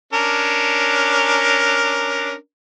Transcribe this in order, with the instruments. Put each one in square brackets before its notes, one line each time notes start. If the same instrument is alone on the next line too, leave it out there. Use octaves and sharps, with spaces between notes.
[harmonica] C#4 D4 A#4